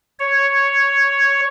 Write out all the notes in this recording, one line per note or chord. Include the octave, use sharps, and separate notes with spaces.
C#5